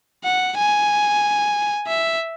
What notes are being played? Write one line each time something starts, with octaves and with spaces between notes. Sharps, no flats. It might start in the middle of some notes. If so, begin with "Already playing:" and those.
F#5
G#5
E5